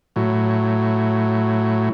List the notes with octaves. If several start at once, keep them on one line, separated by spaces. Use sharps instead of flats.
A2 F#3